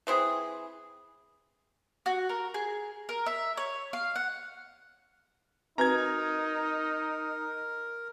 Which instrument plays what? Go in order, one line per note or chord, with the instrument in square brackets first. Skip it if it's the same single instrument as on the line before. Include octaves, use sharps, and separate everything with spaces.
[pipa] E3 C4 E4 G#4
[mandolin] F#4
A#4
G#4
A#4
E5
C#5
F5
F#5
[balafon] C4 F#4 B4 [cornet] D#4 [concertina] A#4 [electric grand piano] A#5 G#6